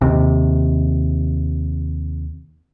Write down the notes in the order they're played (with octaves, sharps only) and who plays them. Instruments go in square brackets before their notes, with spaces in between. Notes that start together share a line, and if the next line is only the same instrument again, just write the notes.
[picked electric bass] D#2 C3